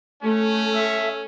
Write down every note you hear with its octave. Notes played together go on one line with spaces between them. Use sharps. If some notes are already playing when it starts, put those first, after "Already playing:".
A3 C#4
E5